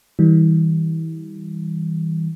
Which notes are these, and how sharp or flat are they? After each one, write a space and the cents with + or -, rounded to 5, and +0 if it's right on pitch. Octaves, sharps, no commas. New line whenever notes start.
E3 -35 G3 +0